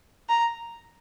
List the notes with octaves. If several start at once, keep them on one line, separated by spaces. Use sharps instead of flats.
A#5